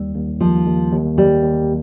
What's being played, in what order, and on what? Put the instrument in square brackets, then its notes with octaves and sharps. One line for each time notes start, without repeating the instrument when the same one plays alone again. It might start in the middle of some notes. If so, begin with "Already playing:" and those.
Already playing: [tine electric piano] D#2 G3
D#2
[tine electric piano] D#2 [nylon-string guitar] F3
[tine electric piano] D#2
D#2
[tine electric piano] D#2 [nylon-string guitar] G3
[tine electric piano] D#2